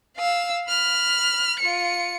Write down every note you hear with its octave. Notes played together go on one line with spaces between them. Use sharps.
F5 E6
B5 F6
F4 C#7